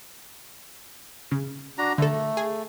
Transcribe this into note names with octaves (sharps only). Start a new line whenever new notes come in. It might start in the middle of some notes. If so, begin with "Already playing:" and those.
C#3
D4 F#4 A#5
D3 A3 A4
G#4